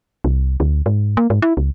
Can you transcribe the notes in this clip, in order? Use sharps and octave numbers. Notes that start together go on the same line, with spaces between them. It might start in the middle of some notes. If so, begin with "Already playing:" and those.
C2
D2
G#2
A#3
G#2
E4
C#2